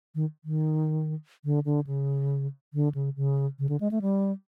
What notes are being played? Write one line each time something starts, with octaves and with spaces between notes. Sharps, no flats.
D#3
D#3
D3
D3
C#3
D3
C#3
C#3
C#3
D3
G#3
A3
G3